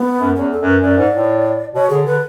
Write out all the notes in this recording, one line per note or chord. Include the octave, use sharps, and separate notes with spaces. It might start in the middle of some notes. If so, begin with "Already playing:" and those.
Already playing: B3
F#2
E2 C#4
A4
F#2
B4
F#2 D5
G#2
A2
B2 C#5
D3 G#4
D3 B4